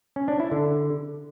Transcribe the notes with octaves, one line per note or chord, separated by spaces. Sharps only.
C#4
D4
E4
D3